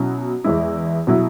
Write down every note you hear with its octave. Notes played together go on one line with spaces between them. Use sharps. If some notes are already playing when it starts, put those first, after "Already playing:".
Already playing: B2 F#3 C#4 E4
E2 E3 G#3 E4
B2 F#3 E4